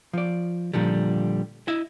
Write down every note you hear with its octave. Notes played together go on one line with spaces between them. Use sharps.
F3 D5
A#2 D3 F3 G3
E4 D#5 E5